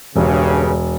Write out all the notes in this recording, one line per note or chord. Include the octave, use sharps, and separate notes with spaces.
E1 G2 C#3